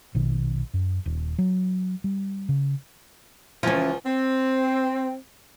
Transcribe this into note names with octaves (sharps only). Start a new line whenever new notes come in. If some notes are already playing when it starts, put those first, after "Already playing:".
A#1 B2 D#3
F#2
D#1
F#3
G3
C#3
C#2 E3 F3 C#4
C4